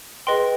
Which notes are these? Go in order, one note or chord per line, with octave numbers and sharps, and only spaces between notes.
G#4 B4 D#5 G5 C6